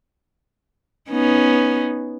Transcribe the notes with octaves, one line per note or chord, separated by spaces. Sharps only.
B3 C#4 D#4